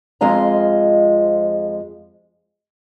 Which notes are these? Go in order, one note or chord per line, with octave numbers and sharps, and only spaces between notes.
F2 F3 G#3 D#5 F5 A#5